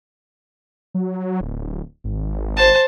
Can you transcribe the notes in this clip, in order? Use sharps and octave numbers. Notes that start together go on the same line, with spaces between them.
F#3
D1
G#1
C5 A5